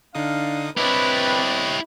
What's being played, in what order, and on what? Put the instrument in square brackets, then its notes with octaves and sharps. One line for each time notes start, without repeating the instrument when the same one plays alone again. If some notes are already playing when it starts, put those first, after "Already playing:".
[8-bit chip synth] D3 D#4 D#6 [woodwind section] D4 F5
[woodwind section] C4 D4 [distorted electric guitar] E4 G4 [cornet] B4 [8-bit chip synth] C#5 D#5 F#6